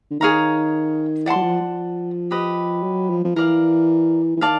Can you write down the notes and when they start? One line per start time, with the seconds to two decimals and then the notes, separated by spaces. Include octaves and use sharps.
0.11 D3
0.20 D#3 G#4 C#5 F5 A#5
1.26 E3 D5 F#5 A5 C6
1.36 F#3
1.43 F3
1.62 F3
2.31 G4 B4 D#5
2.83 F#3
3.10 F3
3.25 F3
3.36 E3 A#4 D5 F5
4.37 E3
4.41 D#3 D5 F5 A5